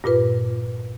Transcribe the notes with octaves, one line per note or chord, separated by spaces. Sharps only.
G2 A#2 F4 B4